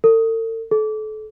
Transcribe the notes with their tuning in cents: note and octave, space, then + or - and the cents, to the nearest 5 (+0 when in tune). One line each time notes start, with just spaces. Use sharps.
A4 +45
A4 -35